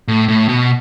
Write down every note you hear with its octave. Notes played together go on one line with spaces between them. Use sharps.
A2
A2
B2